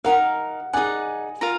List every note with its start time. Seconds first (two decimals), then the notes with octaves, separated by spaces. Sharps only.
0.04 D#4 A#4 F5 F#5
0.73 D#4 G#4 D5 F#5 G#5
1.41 F4 A#4 F5 A#5